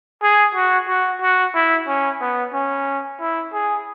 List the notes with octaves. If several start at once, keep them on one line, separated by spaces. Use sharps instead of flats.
G#4
F#4
F#4
F#4
E4
C#4
B3
C#4
E4
G#4